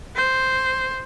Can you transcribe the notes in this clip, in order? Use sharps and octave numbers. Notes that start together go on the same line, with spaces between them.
C5